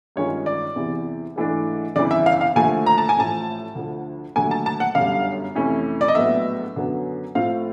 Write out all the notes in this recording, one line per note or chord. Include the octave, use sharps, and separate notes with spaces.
G2 D#3 G#3 C#4 F4 C#5
D5
E2 C3 E3
G#2 E3 A3 D4
G1 F2 C#3 E3 D5
E5
F5
F5
D#2 D3 F3 A3 G#5
A#5
A5
G#5
A1 A2 F3 A5
D2 D3 F3
D#2 D3 F#3 A3 G#5
A5
A5
F#5
G1 F#2 D3 G3 F5
F2 C3 E3 A3 C#4
D5
D#5
A#1 A2 F#3 B3 E5
F#2 D3 F#3 B3
A2 F3 A3 C4 F4 F5